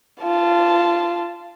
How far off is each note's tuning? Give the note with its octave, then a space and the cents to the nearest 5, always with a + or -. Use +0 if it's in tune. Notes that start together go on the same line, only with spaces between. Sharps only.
F4 -20 A5 +0